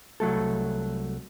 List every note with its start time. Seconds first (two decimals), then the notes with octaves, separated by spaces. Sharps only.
0.20 C2 F#3 A3 A4